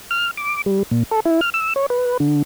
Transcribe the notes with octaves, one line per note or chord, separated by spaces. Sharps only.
F6
D6
G3
A#2
A4
E4
F6
E6
C#5
B4
D3